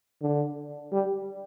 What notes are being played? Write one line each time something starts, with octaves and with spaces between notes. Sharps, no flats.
D3
G3